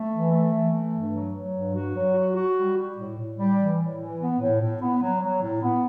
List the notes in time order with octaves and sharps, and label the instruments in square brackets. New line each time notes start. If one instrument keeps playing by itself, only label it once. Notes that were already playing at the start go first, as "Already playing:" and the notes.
Already playing: [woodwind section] A3
E3
A3
E3
A3
G2
F#3
F#3
G2
F#4
F#3
F#4
F#4
G3
G3
A2
A2
G3
E3
A2
E3
B3
A2
A2
B3
F#3
F#3
A2
B3